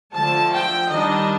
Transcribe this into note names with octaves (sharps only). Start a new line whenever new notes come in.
D3 F3 A3 A5
G5
D#3 G3 D4 D#5